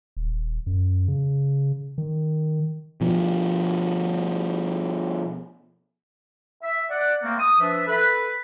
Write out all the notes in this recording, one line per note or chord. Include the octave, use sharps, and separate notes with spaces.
D#1
F#2
C#3
D#3
B2 F3
E5
D5 F#5
A3 A#3 C4
D#6
F3 D4 B4 E5
A4 B4